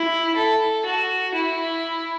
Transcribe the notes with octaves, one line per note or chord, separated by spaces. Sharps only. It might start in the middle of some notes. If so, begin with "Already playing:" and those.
Already playing: E4
A4
F#4
E4